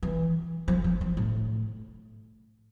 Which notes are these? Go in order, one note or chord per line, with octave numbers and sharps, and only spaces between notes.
E3
F3
F3
F3
A2